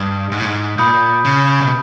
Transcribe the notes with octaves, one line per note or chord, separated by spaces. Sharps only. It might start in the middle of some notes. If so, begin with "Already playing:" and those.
Already playing: G2 D#6
G#2
A2
G#2
A#2 B5 D#6 G6
C#3
B2